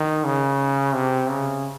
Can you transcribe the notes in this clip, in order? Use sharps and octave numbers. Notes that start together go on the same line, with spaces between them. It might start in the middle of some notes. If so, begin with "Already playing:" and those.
Already playing: D#3
C#3
C3
C#3